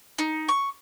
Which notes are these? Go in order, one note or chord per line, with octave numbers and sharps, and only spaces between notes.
D#4
C#6